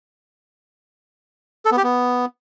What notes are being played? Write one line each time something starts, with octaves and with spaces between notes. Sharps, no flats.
A4
B3
G4
B3